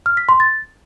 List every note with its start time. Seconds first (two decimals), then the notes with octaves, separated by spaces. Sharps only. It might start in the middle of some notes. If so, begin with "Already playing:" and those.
0.06 F6
0.17 B6
0.29 C6
0.40 A6